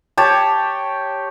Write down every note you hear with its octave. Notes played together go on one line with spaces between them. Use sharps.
G4 C#5 A5